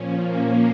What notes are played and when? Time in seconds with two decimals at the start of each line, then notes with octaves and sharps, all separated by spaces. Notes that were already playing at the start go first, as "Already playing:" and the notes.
Already playing: A#2 F3 C#4
0.27 A#3